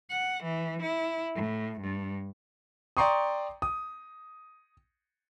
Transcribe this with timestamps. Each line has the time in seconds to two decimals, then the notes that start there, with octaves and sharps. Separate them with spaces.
0.10 F#5
0.43 E3
0.82 E4
1.35 A2
1.81 G2
2.97 D5 G5 A#5 C6 C#6 D#6
3.62 D#6